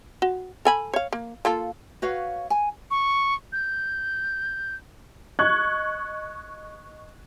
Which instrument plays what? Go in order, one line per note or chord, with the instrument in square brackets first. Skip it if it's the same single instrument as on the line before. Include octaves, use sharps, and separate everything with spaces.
[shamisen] F#4
A4 G#5 B5
C#5 F5
A#3
A#3 F4 A4
[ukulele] F#4 B4 C#5 F5
G#5
[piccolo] C#6
G6
[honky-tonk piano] D#5 C#6 F#6 G#6